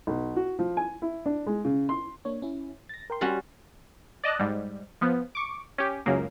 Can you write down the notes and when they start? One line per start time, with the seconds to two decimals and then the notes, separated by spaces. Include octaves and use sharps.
0.07 B1
0.36 F#4
0.59 F3
0.77 G#5
1.02 E4
1.26 D4
1.47 G#3
1.65 C#3
1.89 C6
2.25 A#3 D4 C#5
2.42 C#4 E4
2.89 A6 A#6
3.10 A#4 G5 C6
3.21 G3 C#4 F#4
4.24 D5 D#5 A5 F#6
4.39 G#2 G3
5.01 F3 B3
5.35 C#6 D6
5.78 C#4 G4
6.06 C#2 F#2 C#3 A#3